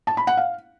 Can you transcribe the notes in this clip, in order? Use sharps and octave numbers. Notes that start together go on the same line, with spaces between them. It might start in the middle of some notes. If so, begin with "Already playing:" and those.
A5
B5
F#5
F5